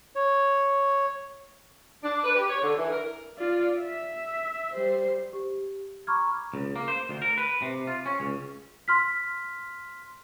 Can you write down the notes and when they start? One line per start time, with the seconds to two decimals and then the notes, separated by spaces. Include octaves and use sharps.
0.16 C#5
2.03 D4
2.24 B4
2.36 G4
2.49 C#5
2.62 D3
2.77 E3
2.91 A#4
3.37 F4 D5
3.80 E5
4.73 G3 C5
5.33 G4
6.07 A#5 B5 C#6 D6 F6 G#6
6.54 C#2
6.76 A#3
6.88 C5
7.09 D2
7.22 A#4
7.38 B4
7.62 C3
7.87 F4
8.06 C#4
8.20 C#2
8.88 C6 F6 B6